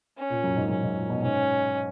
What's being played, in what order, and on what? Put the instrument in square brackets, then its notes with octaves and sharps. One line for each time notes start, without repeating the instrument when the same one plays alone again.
[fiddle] C#4
[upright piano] A#2
F#2
G#2
[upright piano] F#2 [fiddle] C#4
[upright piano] G#2
A#2
B2
[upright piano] G#2 [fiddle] C#4